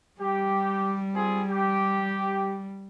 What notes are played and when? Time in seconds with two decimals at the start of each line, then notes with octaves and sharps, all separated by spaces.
0.20 G3 G4
1.14 C4 F4 G#4
1.48 G4